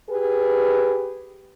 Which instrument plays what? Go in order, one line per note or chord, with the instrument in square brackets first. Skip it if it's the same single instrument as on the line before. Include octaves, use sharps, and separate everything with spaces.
[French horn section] G4 G#4 B4